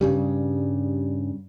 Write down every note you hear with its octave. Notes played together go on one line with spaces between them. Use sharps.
G2 C#3 G3